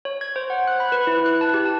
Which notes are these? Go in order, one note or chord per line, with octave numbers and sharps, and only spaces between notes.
C#5
G#6
C5
F#5
F#6
B5
B4
E4
F#6
A5
G4
A5